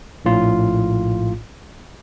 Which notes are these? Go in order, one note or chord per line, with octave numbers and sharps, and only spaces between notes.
A#1 A2 F4